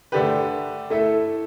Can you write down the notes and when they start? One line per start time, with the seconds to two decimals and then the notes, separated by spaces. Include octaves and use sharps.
0.12 D3 A3 D4 G4 B4
0.90 A3 E4 A4 E5